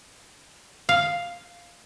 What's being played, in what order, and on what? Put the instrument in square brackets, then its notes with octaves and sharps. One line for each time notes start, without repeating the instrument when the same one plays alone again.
[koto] F5